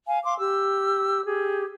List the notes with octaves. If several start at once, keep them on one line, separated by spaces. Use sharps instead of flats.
F5 G#5
F5 C6 D6
G4 E6
G4 G#4